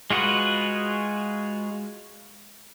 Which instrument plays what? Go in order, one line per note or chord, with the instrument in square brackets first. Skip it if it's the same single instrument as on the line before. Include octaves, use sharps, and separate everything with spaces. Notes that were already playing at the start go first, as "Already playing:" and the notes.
[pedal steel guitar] G#3 F4 F#4 G#4 B4